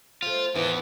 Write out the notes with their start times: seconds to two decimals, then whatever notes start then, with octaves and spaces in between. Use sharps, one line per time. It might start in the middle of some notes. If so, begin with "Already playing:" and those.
0.22 F3 A3 F4
0.55 E2 A2 D#3 E3 A3